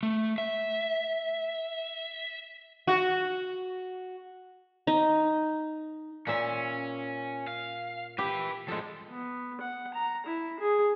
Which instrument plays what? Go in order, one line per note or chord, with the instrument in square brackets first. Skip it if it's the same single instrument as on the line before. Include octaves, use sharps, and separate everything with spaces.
[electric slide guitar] A3
E5
[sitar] F#4
[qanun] D#4
[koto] A#2 E5 [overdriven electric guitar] C#4
[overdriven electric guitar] F5
[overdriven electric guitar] E4 B4 [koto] G4
[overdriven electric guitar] A2 F3 [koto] G#3 A4
[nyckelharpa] B3
F#5
A#5
E4
G#4